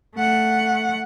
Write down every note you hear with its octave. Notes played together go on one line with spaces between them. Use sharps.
A3 F#5